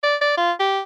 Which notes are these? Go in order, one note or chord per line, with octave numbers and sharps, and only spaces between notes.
D5
D5
F4
G4